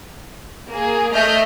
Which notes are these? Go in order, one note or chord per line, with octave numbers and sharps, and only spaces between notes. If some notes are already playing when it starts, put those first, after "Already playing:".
A#3 G#4
A3 D#5 E5 F6 G6